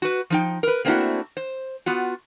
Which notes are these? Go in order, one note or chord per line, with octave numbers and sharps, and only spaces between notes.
F#4 B4
F3 D#4 G5
A#4 B4
A3 A#3 C4 D4 E4 F#4
C5
B3 F4 F#4